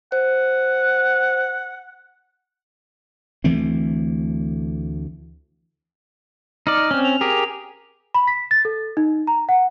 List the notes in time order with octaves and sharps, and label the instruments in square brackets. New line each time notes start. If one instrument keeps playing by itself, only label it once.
[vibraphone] C5 [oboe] F#5
[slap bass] D2 E3 A3 C4
[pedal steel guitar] D#4 D5 [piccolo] F6
[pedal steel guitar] C4 C#4
[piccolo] F7
[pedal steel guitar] G4 G#4 A#4
[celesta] B5
B6
A6
A4
D#4
A#5
F#5